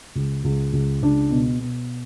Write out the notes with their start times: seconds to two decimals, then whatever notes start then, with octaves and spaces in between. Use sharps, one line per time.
0.15 C#2
0.44 C#2
0.73 C#2
1.02 C#2 D4
1.31 B2
1.60 B2